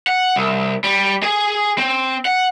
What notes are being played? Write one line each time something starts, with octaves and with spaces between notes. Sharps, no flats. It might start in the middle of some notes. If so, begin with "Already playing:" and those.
F#5
C2
G3
G#4 G#5
C4
F#5